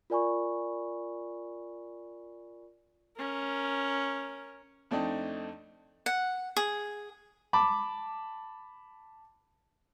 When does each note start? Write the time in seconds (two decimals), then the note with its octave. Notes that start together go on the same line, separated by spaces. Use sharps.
0.10 F4 A#4 D5 G#5 B5 C#6
3.17 C#4 A#4
4.91 F2 A3 C4 D4 D#4
6.06 F#5
6.57 G#4
7.53 A5 B5 D6